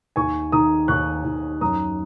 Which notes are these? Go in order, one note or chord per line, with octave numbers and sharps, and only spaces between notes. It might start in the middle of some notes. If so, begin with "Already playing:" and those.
D#2 G#5 C#6
D#3 A#5 D#6
D#2 C#6 F#6
D#2
F#2 A#5 D#6